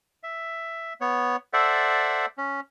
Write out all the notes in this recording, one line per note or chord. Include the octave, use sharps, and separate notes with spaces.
E5
B3 C#5
A4 C5 D5 E5 F#5
C#4